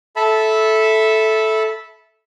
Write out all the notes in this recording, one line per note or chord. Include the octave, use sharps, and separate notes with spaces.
A4 E5 A5 B5